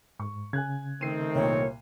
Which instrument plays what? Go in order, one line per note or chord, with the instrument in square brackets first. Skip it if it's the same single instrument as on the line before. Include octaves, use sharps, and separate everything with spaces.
[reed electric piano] G#2 [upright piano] C#6
[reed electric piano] C#3 [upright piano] G#5 F#6 G#6
[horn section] D#3 A3 C4 [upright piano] C7 D#7
[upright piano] C2 A#2 [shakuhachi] C#5